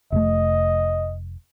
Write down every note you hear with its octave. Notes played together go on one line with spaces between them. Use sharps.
F1 A3 D#5